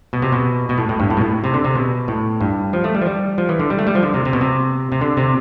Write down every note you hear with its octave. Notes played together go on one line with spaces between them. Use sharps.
B2
C3
B2
B2
A2
A2
G2
A2
B2
A2
C3
D3
C3
B2
A2
G2
F3
A3
G3
F3
G3
F3
E3
D3
G3
A3
G3
F3
D3
C3
C3
B2
C3
C3
D3
C3